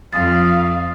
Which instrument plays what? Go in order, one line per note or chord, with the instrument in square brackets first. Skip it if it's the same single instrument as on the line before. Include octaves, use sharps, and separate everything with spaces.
[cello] F2 [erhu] F5 [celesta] D#6 A6